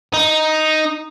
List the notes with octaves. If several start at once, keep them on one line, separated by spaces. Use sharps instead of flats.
D#4